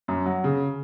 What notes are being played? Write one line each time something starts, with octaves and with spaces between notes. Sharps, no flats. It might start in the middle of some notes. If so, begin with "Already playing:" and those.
F#2
F#3
C#3